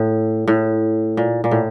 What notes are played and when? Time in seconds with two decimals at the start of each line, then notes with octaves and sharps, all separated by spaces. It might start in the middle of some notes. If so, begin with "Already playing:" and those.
Already playing: A2
0.48 A2
1.17 A#2
1.44 A#2
1.51 A2